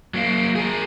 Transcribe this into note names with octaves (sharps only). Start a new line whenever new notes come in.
F#3 A#3
G#4 A#4